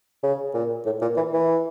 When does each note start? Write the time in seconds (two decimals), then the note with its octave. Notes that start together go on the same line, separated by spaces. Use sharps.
0.23 C#3
0.54 A#2
0.86 A2
1.01 A#2
1.17 E3
1.33 E3